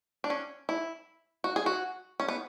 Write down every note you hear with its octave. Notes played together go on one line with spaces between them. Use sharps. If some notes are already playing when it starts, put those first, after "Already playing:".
D4
C#4
E4
F#4
G#4
F#4
C#4
B3